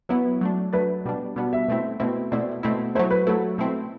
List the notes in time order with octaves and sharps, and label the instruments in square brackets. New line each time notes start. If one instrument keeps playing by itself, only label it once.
[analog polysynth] F#3 B3 E4 [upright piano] B4
[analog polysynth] F#3 A3 D4
[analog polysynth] F#3 A3 D4 [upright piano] B4
[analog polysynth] B2 G3 B3 D4
B2 G3 B3 D4
[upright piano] E5
[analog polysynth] B2 A3 C4 E4
B2 A3 C4 E4
[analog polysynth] B2 A3 C4 E4 [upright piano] D5
[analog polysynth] B2 A3 C4 E4
[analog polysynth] F#3 A3 E4 [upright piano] C5
[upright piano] B4
[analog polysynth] F#3 A3 E4 [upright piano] A4
[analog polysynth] B2 A3 C4 E4